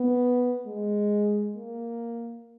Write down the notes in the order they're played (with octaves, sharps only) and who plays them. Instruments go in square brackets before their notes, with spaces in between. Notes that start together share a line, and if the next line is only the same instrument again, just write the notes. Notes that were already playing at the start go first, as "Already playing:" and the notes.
Already playing: [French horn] B3
G#3
A#3